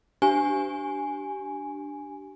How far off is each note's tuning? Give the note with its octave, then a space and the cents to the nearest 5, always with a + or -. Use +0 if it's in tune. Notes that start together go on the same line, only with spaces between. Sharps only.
D4 +0 G4 -25 G#5 +0